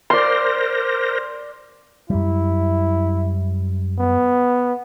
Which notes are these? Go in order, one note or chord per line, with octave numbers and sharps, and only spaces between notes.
A#4 C5 D5 C6 A#6
F#2 G3 E4
B3